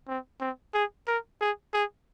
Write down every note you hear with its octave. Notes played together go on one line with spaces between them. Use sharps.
C4
C4
G#4
A#4
G#4
G#4